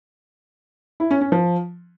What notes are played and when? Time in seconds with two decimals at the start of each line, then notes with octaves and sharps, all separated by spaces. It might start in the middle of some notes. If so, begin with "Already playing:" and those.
1.00 E4
1.11 C#4
1.21 C#4
1.32 F3